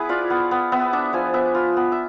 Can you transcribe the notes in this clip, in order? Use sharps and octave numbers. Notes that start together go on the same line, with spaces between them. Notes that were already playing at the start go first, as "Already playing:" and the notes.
Already playing: B3 E4 G#4 B4
F4 D5
B3
B3
B3 E5
D4 E5
F3 G#5
B3 E5
F4
B3
E5